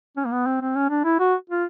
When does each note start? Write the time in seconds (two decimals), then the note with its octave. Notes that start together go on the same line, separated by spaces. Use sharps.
0.17 C#4
0.25 A#3
0.32 B3
0.46 C4
0.61 C4
0.76 C#4
0.90 D4
1.04 E4
1.19 F#4
1.49 F4